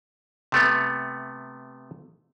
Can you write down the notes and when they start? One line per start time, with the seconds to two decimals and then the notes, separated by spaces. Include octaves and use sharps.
0.52 C3 A3 B3